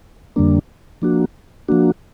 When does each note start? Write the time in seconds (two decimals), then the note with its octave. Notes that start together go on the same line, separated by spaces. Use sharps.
0.36 F2 D3 G3 A#3 D4
1.02 F3 A#3 D4 F#4
1.68 F3 A#3 D4 F#4